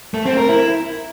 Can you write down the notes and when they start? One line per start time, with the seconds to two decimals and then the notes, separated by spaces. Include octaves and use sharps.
0.14 A3
0.26 C4
0.37 A#4
0.49 E4